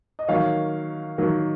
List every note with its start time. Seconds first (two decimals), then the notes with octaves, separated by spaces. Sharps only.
0.19 D#5
0.28 D#3 F#3 A#3 C#5 F5
1.18 D#3 F#3 A#3